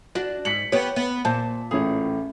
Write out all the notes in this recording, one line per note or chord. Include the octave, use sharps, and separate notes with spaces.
D4 F#4
G#2 B6 C#7 F#7
B3 G4 C#5
B3
A#2 C5 A5
A1 A2 G#4 C#5